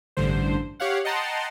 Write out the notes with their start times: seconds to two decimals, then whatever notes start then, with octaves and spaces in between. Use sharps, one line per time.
0.17 A1 G2 D3 C5
0.80 G4 C#5 F5 F#5
1.05 D#5 F#5 G5 A5 A#5 C6